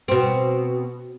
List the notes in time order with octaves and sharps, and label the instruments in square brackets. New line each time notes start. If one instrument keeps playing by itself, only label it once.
[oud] B2 C4